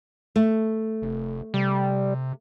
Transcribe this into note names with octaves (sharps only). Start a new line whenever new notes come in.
A3
F1
C3 G3